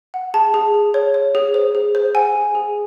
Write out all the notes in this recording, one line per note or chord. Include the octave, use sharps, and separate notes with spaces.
F#5
G#4 A5
G#4
G#4
C#5
C#5
G#4
C5
G#4
C5
F#5 G#5
G#4
G#4